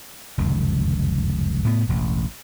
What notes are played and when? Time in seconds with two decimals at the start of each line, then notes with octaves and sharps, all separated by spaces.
0.38 F1 C#2 F#2 D#3
1.65 A2 B3
1.89 E1 A1